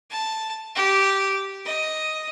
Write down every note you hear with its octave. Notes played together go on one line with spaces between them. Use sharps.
A5
G4
D#5